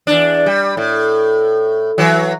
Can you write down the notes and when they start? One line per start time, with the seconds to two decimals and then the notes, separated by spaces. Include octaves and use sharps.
0.07 E2 D4
0.46 G3
0.77 A2
1.98 E3 F#3